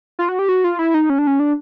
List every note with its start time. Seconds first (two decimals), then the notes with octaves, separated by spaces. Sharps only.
0.19 F4
0.29 F#4
0.39 G4
0.49 F#4
0.64 F4
0.79 E4
0.94 D#4
1.10 C#4
1.18 D4
1.27 C#4
1.40 D4